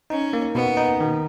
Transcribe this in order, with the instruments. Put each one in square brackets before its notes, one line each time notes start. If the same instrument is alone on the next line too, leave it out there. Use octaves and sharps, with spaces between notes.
[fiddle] C#4 [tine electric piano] D#4
[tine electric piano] A#3
[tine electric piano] B2 [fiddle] B3
[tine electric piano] D#4
D#3